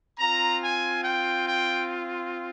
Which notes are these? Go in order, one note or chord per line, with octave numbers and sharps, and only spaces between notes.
C4 F4 A#5
G#5
G5
G5